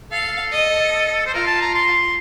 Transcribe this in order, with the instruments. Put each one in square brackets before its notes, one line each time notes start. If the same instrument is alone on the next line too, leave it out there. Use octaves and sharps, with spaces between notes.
[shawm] A4 [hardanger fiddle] F5
[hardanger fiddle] D#5
[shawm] C5
[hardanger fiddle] F4 [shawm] A#4
[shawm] A5
A#5
C6